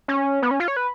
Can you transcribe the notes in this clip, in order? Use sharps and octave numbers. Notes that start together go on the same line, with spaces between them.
C#4
B3
C#4
F4
C#5
B4